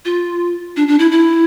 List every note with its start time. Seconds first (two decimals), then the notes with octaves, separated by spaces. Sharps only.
0.05 F4
0.76 D4
0.88 D4
0.99 E4
1.12 E4